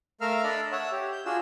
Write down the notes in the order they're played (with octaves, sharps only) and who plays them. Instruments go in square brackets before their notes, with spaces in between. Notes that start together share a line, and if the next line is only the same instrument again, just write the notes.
[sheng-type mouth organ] A3 A#4 E5 F5 F6
D4 A4 D5 D#5 B5
C#5 E5 F#5
G4
G6
D4 F4 F#4 G#4 E6